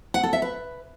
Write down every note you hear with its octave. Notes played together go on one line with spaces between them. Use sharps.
F#5
A4
E5
B4